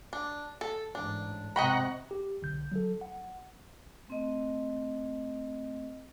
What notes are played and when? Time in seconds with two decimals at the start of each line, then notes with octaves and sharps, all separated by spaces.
0.13 D4
0.61 A4
0.95 A1 G#2 D4
1.56 G#2 C3 D#5 F#5 G5 A#5 B5 C#6
2.11 G4
2.42 B1 D3 G6
2.72 F#3 A4
3.01 F#5
4.08 A3 C4 D#5